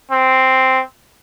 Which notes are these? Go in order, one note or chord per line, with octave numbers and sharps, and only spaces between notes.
C4